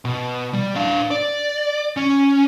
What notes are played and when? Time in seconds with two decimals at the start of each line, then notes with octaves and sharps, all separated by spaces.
0.05 B2
0.53 G3
0.76 D4 F5
1.11 D5
1.97 C#4